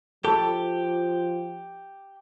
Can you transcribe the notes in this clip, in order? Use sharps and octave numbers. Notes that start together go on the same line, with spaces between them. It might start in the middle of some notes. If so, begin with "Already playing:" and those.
F3 G4 A4